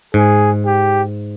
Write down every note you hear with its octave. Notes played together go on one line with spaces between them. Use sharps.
G#2 G#4
G4